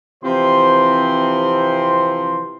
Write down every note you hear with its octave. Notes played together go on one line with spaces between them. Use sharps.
C3 E3 F3 C4 C5 C6